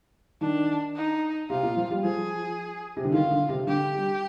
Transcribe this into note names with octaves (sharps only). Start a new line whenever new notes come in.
D#3 D4
D#4
C3 F4
A#2
F3
G3
F3 G#4
C3
D3
D#3 F4
D3
C3
D3 G4
G3